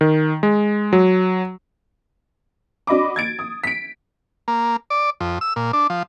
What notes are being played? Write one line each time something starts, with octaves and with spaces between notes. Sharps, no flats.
D#3
G#3
F#3
D4 F#4 D#5 B5 D6
G#6 A6 D7
D#6
B6 D7
A#3
D5
F2
E6
A#2
D4
F3